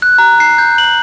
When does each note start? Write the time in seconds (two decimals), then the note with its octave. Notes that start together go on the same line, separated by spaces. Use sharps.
0.02 F#6
0.18 A#5
0.40 C7
0.58 G6
0.78 F#7